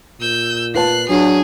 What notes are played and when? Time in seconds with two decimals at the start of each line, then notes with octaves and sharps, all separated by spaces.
0.20 A#2 E6 G6
0.74 F4 B4 A5 F#6 C7
1.09 F#3 D4 G#4